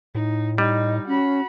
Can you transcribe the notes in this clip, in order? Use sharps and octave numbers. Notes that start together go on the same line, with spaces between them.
A2 D#4
G3 D#4 D#5
C#4 F#4 B5